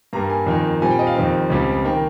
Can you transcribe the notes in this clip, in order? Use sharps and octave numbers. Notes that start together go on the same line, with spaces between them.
G2 G3 A#3 A#5
G#5
F2 D#3 A#3
A#2 G3 C4 G#5
G5
D#5
F5
F2 D#3 G3 C4
C#2 C#3 G3 C4
D#3 A#3 G5